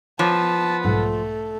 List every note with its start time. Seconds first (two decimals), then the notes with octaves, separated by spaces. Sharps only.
0.19 F3 B3 C#5 A5 A#5 D6
0.85 B1 G#2 A3 A4 F#5